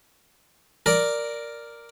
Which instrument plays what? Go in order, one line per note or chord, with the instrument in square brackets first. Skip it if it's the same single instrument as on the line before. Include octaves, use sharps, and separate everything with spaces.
[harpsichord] A#4 D5